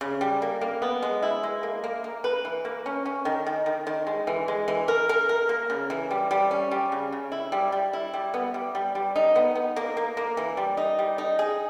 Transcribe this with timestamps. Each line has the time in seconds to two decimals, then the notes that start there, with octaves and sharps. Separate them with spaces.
0.01 C#3
0.21 G3
0.42 A#3
0.61 A#3
0.82 B3
1.02 G#3
1.23 E4
1.43 G#3
1.63 A#3
1.84 A#3
2.04 A#3
2.24 B4
2.45 E3
2.65 A#3
2.86 C#4
3.06 C#4
3.25 D#3
3.47 D#3
3.66 D#3
3.87 D#3
4.07 G#3
4.27 E3
4.48 G#3
4.68 E3
4.88 A#4
5.09 A#4
5.29 A#4
5.49 A#3
5.70 C#3
5.90 E3
6.11 G3
6.31 G3
6.51 C#4
6.71 G3
6.92 C#3
7.12 C#3
7.32 E4
7.52 G3
7.72 G3
7.93 E4
8.14 G3
8.34 B3
8.54 G3
8.75 G3
8.95 G3
9.16 D#4
9.35 B3
9.55 B3
9.76 A#3
9.97 A#3
10.17 A#3
10.37 E3
10.57 G3
10.77 D#4
10.99 G3
11.18 D#4
11.39 G#4